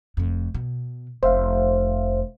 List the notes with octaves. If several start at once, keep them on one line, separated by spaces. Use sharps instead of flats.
F1 F2
B2
F1 C5 E5 F5